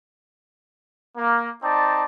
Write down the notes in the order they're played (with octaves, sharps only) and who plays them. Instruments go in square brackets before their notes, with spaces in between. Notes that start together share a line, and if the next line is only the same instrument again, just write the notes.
[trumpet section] A#3
C4 D#4 D5 A5